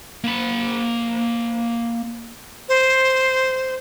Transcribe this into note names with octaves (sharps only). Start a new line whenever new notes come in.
A#3 B5
C5